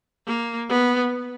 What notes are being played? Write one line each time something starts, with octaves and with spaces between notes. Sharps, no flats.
A#3
B3